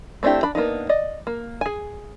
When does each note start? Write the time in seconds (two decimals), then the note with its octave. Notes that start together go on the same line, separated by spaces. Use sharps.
0.23 A3 C4 D4 E4 G4
0.43 D4 B5
0.55 A#3 B3 D4 D#4
0.89 D5 D#5
1.27 A#3
1.61 G#4 G#5